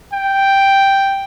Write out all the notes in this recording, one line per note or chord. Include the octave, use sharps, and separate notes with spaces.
G5